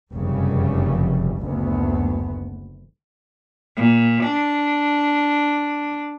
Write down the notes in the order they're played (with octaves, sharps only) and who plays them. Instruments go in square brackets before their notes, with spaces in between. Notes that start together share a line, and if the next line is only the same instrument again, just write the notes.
[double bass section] F1 F#2 C#3 G3
F#1 D2 B3
[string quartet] A#2
D4